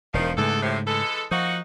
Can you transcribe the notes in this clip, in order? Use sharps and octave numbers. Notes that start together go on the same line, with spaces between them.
E1 D#3 F3
E2 G#2 C#3 A3 A4
A2 C3
E3 G#3 A4
F3 A#3 D#4 F#4